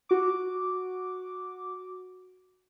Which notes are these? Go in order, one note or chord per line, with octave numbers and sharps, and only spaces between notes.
F#4 D6